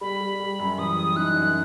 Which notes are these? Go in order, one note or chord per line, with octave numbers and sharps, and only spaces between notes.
G3 B5
G3
G3
F#2
E3 D#6
G3
D#4 F#6
F#2